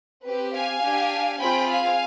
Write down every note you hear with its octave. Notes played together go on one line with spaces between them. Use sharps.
C4 G4 B4
F5 G#5
D4 G4
C4 F4 G#4 G5 B5
F5 G#5